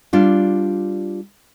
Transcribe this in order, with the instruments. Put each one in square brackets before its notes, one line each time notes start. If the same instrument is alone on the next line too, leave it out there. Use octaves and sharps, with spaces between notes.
[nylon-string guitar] G3 D4 F4